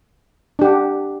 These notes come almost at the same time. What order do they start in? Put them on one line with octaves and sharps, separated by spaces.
D4 G4 F#5